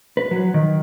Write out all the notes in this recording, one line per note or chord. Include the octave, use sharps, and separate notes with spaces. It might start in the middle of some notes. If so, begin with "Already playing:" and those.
B4
F#3
D#3